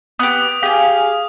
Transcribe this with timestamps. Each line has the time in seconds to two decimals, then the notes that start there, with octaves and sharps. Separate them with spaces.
0.19 B3 G4 D#6
0.63 G4 G#4 F5 G#5